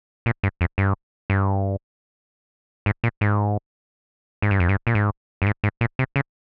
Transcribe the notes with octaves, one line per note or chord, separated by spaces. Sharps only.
A#2
G2
F2
G2
G2
G#2
A#2
G#2
G#2
G2
F2
G2
A#2
G#2
G2
G#2
G#2
A#2
C3
C#3